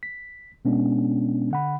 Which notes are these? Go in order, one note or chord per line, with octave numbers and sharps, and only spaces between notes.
B6
B2 G#3 B3 C#4 D4
D3 F#5 B5